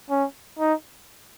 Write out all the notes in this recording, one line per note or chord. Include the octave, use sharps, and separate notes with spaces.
C#4
D#4